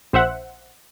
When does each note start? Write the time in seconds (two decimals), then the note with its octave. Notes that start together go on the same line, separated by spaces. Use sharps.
0.13 A#1 C5 E5 F#5